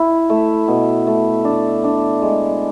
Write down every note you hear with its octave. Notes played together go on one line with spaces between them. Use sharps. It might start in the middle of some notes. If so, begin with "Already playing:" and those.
Already playing: E4
A3
B2
A3
D4
D4
G#3